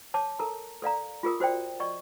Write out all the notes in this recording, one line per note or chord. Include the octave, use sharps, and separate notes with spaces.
C#5 A5 D6
A4 A#4 A#5
A4 D5 F5 A#5
F4 G#4 A#4 D#6
F#4 C5 D5 G5
D5 D#5 C#6